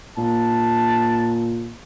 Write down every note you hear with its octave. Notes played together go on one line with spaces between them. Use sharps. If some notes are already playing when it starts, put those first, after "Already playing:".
A#2 A5